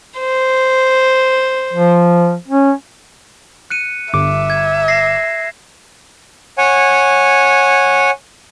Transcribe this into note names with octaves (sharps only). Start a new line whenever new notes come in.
C5
F3
C#4
F#6 C#7 D#7
G1 E5 D6
G#6
A#6 C7
C#5 F#5 G#5